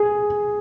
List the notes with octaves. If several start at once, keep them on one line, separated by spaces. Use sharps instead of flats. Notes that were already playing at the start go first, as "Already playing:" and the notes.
Already playing: G#4